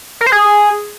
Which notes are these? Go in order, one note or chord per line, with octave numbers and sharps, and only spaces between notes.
A#4
C5
G#4